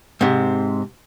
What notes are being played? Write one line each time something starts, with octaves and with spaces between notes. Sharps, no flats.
G#2 C3